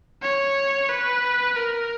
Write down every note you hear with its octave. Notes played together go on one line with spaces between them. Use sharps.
C#5
B4
A#4